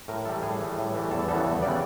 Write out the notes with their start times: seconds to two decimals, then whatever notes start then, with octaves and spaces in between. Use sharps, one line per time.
0.08 A2 A#4
0.25 E3 G3 A4
0.43 A2 G#4
0.60 E3 G3
0.78 A2
0.95 E3 G3
1.11 E2 A4
1.28 C#3 E3 G3 B3 A4
1.46 E2
1.62 C#3 E3 G3 B3 D5